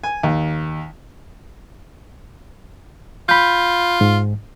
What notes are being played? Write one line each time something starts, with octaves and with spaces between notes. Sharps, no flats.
G#5
D#2
F4 B5 G6
G#2